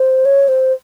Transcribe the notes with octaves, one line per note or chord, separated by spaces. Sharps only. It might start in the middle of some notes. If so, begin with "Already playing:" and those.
Already playing: C5
C#5
C5